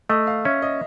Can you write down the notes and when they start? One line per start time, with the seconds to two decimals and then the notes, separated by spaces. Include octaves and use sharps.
0.09 A3 D#5
0.27 F5
0.45 C#4 E5
0.62 D#5